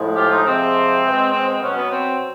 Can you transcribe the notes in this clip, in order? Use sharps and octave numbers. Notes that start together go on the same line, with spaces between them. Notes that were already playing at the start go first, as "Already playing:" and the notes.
Already playing: A2 F3 G#3
F4 G4
D#4 F4
C3 F3 G#3 C4
B2 G#3
C4
C4
B2 F#3 B3 C#4
B3
C4